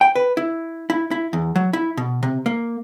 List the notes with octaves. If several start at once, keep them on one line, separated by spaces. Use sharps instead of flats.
G5
B4
E4
E4
E4
E2
F#3
E4
B2
C3
A#3